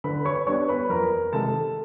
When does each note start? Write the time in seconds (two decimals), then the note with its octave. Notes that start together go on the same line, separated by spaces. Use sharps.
0.04 D3 B4 B5
0.25 C#5 C#6
0.47 G3 B3 D4 C#5 C#6
0.68 B4 B5
0.90 F2 A#4 A#5
1.33 C3 D#3 G#3 A4 A5